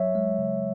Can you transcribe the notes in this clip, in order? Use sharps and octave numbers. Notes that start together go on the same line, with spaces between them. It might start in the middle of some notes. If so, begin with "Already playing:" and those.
Already playing: F#3 C#5 E5
G#3
C#3